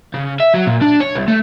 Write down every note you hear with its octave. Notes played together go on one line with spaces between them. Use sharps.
C#3
E5
F#3
A#2
D4
C#5
C2
A3